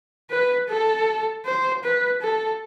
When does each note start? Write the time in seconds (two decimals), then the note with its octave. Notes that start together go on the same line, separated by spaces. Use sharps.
0.30 B4
0.69 A4
1.46 C5
1.84 B4
2.22 A4